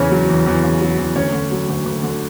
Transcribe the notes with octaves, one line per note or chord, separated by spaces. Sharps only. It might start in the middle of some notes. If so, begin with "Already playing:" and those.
Already playing: E2 C#3 C#4 C#5
F#3
E2
E2
C#3
F#3
E2
D2 C#4 C#5
D3
F#3
D2
D2
D3